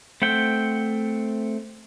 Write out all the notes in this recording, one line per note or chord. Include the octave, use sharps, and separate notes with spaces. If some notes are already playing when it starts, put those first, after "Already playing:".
A3 C4 F#5 G5